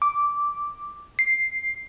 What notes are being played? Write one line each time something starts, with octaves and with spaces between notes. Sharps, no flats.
D6
C7